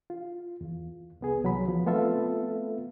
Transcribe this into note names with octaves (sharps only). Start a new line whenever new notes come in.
F4
E2
C2 B3 G#4
C2 F#3 B5
F3 B3
A3 B3 C4 F4 A4 E5